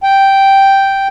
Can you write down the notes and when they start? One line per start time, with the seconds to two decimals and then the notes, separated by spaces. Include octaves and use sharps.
0.03 G5